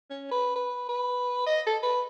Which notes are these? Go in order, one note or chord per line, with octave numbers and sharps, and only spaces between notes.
C#4
B4
B4
B4
D#5
A4
B4